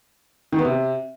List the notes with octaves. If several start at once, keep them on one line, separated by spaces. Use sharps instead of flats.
D#3
B3
C3